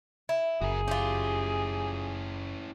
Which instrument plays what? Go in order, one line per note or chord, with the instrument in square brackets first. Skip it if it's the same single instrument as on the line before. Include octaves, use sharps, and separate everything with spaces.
[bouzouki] E4
[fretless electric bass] F#1 [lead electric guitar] F#4 A#4 [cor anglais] G#4
[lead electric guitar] C#4 E4 [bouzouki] F4 G4